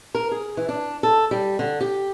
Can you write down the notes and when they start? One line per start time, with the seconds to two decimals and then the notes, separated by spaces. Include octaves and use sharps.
0.15 A#4
0.31 G#4
0.57 E3
0.69 D4
1.03 A4
1.31 G3
1.59 D3
1.81 G4